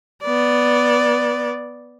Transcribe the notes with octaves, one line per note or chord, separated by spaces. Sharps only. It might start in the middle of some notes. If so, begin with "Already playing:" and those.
B3 D5